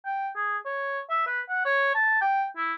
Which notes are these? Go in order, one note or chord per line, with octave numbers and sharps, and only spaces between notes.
G5
G#4
C#5
E5
B4
F#5
C#5
A5
G5
E4